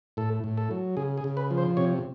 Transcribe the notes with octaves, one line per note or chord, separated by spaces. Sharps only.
A2 A4
A2
A4
F#3
C#3 G#4
G#4
C#3
B4
F3
C5
C3 C#5